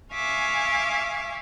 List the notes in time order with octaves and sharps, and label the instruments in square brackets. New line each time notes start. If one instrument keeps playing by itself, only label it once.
[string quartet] E5 F5 G#5 C#6 D6